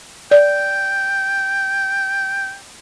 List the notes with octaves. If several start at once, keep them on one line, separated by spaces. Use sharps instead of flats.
D5 G5